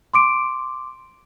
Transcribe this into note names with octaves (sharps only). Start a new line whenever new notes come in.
C6 D6 D7